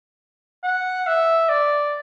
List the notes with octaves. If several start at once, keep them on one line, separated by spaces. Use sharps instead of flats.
F#5
E5
D5